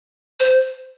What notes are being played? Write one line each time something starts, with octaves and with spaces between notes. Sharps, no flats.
C5